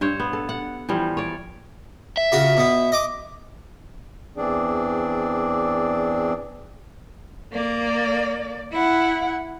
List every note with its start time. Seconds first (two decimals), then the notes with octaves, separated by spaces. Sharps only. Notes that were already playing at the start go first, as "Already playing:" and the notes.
0.01 G2 C5 C#5
0.20 B3
0.33 A4
0.49 F#5
0.89 E3 F3 G3
1.17 C#5 D5
2.17 E5
2.32 C#3 F4 F#4
2.57 B2 B3
2.92 D#5 D6
4.37 E2 E3 C4 D4 G#4 D5
7.53 A#3 D5
8.72 E4 F#5